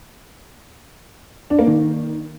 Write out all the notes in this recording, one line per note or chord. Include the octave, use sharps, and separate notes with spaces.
D4
A#3
D#3